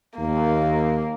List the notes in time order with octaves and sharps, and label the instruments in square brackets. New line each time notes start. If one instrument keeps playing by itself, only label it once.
[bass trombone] D#2 [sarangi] A#3